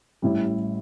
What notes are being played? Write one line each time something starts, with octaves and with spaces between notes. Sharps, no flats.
A1 A2 G3 E4